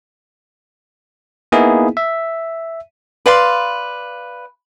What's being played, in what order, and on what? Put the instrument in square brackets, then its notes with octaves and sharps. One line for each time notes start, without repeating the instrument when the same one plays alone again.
[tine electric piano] A#3 B3 D#4 E4 G#4
E5
[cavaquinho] B4 D5 F5 C6